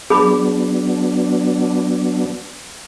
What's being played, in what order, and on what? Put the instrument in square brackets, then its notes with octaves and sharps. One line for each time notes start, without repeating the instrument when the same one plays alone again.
[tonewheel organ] F#3 B3 D4 [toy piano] G#4 B5 D6